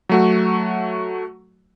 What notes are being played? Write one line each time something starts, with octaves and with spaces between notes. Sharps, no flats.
F#3 A3 F#4